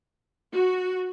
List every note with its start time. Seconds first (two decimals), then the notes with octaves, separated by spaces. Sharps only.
0.52 F#4